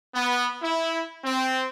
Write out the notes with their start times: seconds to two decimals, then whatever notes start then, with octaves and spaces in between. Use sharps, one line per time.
0.15 B3
0.62 E4
1.24 C4